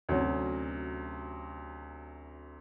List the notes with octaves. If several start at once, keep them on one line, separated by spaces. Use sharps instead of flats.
D2 C3 F#3 C#4